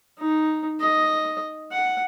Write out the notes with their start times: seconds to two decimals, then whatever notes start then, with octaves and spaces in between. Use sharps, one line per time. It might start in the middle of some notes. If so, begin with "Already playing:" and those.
0.19 D#4
0.80 D#5
1.72 F#5